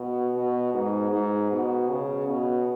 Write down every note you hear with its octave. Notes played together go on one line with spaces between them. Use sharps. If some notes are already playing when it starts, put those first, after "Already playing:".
Already playing: B2
B2
G#2
G#2
B2
C#3
B2